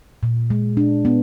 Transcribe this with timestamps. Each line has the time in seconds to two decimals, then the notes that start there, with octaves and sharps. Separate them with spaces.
0.23 A#2
0.50 G#3
0.77 D4
1.05 B3